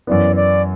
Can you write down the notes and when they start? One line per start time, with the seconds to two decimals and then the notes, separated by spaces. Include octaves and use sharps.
0.07 F#2 E3 B3 D5
0.36 D5